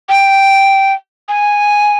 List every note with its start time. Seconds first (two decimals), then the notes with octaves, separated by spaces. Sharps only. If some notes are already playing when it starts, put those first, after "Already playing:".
0.09 G5
1.28 G#5